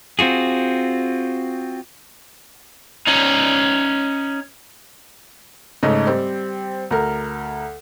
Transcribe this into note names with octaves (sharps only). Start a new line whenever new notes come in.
C4 F4 F#4 G#4
C#4 D#4
G#2 C#3 A3 D#5
G3 C4
D2 A#4